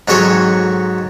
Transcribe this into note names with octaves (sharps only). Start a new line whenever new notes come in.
G#2 F#3 C4 A4 C#5 G#5